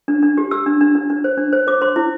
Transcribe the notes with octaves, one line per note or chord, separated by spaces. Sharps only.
D4
D4
G4
G4 E6
D4
D4
D4
D4
C5
D4
C5
C5 D6
C5 C6
E4